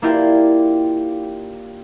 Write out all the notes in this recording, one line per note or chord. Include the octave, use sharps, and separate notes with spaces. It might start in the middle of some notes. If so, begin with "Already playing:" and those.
A#3 D4 E4 F4 G4 A#4